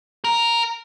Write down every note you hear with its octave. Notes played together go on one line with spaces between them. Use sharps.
A#4